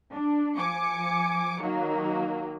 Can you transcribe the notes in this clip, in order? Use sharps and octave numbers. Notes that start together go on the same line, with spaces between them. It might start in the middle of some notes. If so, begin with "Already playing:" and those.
D4
F3 G#5 D6 C#7
D#3 F#3 A#3